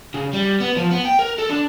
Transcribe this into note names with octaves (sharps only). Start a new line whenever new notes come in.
C#3
G3
B3
F3
B3
G5
A#4
A4
D4